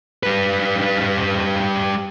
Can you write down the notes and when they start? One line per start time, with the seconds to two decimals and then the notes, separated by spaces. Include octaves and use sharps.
0.23 G3 B4